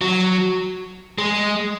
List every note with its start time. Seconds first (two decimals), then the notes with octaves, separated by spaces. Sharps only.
0.01 F#3
1.18 G#3